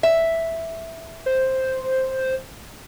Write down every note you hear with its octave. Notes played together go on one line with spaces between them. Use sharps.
E5
C5